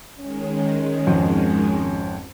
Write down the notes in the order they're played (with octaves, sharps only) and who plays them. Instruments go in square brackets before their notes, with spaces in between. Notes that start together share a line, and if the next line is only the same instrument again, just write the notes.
[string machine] D#3 G#3 [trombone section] C#4
[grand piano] G#1 F2